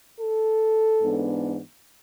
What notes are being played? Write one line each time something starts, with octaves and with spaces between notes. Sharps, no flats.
A4
G#2 E3 B3 D4